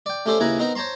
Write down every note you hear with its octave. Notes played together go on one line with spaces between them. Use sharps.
D5 G5
A3 C#4 G4 A4 C5 D5
D#2 C#3 E4 B4 G#5 A#5
B3 C4 D#4 A#4 A#5
C5 C#5 A5 A#5 C6